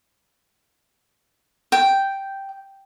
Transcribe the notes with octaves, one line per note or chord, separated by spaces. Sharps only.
G5